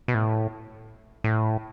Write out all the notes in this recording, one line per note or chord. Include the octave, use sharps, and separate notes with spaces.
B2
A2
A2